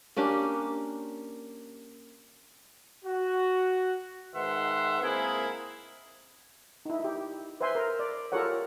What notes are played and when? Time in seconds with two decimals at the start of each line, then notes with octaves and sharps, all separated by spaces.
0.16 A#3 C#4 D4 G4
3.04 F#4
4.34 G#2 D#3 B4 E5 F#5 C6
5.01 G#2 A#3 C4 E4 G#4 A#4
6.85 D#4 E4
7.00 E4 G4
7.61 B4 C5 E5 G#5 C6
7.75 A#4
7.99 D5
8.32 F4 G4 A4 A#4 C#5 F#5